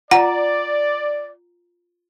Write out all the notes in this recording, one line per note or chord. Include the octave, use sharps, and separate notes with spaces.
F4 D5 F#5 A#5